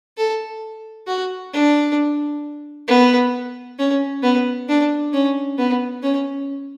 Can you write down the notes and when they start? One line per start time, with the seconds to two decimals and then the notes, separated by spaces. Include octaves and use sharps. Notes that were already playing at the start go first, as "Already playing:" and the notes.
0.18 A4
1.07 F#4
1.53 D4
2.88 B3
3.79 C#4
4.23 B3
4.69 D4
5.13 C#4
5.58 B3
6.03 C#4